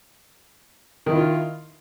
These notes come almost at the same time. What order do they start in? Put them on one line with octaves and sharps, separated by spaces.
D#3 E4 F4